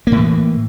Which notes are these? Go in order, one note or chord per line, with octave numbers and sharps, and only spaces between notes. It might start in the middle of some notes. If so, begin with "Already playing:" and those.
A2 E3 A#3